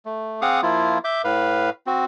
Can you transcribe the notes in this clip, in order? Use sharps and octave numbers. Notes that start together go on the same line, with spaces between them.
A3
C4 G#4 F5 F#5 D6 D#6
F3 A#3 E4 F4
E5 D6 G6
A2 B4 F5
C4 F#4